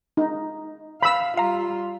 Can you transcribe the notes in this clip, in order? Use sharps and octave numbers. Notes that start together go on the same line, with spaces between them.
D#4
F5 B5 E6
G3 F4 F5 A#5